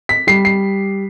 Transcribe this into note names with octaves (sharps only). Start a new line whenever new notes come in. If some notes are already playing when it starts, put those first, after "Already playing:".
B6
G3 C7
C7